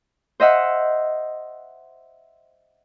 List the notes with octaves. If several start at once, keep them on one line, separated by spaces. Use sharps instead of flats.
C5 D#5 E5 F#5